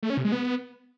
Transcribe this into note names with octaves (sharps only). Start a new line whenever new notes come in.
A3
C#4
C3
G#3
B3